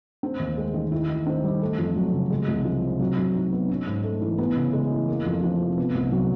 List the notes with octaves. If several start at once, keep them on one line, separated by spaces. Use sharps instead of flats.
C4
D#2
G#3
D#3
E4
D#3
C4
G3
A3
F2
F#3
C#3
G#3
C2
F3
C3
F#3
F#3
D#4
B3
C#4
G#2
A3
E3
B3
C#3
G#3
E3
A#3
F2
F3
C3
B3
C2
F#3